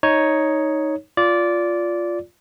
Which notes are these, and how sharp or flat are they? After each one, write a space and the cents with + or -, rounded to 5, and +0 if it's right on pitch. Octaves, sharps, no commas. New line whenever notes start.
D#4 +5 C#5 +0
F4 +0 D5 -15